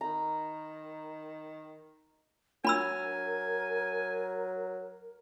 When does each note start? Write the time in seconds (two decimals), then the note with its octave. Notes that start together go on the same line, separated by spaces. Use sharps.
0.01 D#3 A#5 B5
2.65 F#3 D4 A#4 G#5 B5 E6